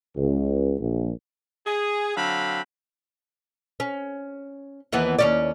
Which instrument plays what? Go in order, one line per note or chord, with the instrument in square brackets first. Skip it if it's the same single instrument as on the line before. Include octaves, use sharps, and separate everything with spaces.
[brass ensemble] C#2
A#1
[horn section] G#4
D3 F#3 C4 F5 B5
[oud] C#4
D#2 E3 B3
D#2 C#4 D5